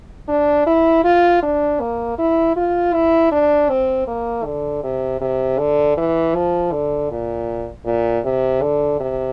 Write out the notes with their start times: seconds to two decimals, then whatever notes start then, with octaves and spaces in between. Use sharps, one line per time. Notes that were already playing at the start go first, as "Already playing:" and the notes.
0.28 D4
0.66 E4
1.04 F4
1.43 D4
1.80 A#3
2.18 E4
2.56 F4
2.94 E4
3.32 D4
3.69 C4
4.07 A#3
4.45 D3
4.83 C3
5.21 C3
5.58 D3
5.97 E3
6.35 F3
6.72 D3
7.11 A#2
7.86 A#2
8.25 C3
8.62 D3
9.00 C3